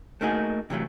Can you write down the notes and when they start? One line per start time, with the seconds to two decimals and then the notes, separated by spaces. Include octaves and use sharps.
0.21 A3 A#3 D#4 F#4 G#4
0.70 C3 E3 F#3 A3